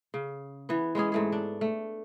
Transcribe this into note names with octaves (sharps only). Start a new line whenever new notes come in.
C#3
E3 B3
G#3 B3 C#4 G#4
G#2 A3 G#4
D4
A3